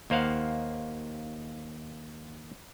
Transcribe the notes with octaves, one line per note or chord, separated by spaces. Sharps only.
D#2 A#3 C5 F5 F#5